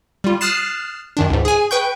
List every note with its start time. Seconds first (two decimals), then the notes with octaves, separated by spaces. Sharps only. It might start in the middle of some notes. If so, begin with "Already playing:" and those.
0.24 G3 F4
0.41 D#6 F6 F#6 A6 C7 E7
1.17 F#2 D#3 D4
1.30 C#2 G#2
1.45 G#4 G#5
1.71 B4 G5 C#6 G6